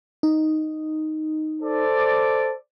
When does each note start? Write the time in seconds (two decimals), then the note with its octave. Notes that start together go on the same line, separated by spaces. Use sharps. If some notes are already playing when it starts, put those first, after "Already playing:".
0.23 D#4
1.62 A4 C5 D5